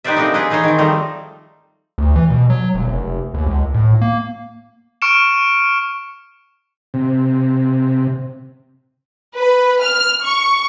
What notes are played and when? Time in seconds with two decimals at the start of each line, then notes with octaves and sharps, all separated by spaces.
0.04 D#4 G4 B4 C5 D5 E5
0.16 F3 A3 A#3 C4 D4 D#4
0.34 E4 F4 G#4 B4 D#5
0.50 E3 D#4 G#4 C5 C#5
0.64 D#3 C4
0.78 F3 G3 A3 D#4
1.98 D2
2.16 E3
2.30 B2
2.50 F#3
2.74 E1
2.88 F1
3.34 D#2
3.47 C#2
3.74 A2
4.01 A#3
5.02 C#6 F6 C#7 D7 E7
6.94 C3
9.35 B4
9.81 F6
10.24 C#6